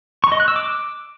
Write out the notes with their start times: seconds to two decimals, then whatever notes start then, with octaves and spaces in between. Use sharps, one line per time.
0.24 C#6
0.32 D#5
0.40 F#6
0.48 E6
0.56 D6